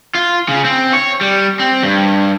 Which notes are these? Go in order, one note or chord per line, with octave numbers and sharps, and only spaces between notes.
F4
C#3
C4
C#5
G3
C4
G2